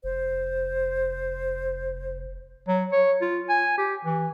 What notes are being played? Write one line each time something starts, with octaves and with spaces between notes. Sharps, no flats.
F1 C5
F#3
C#5
F4
G#5
G4
E3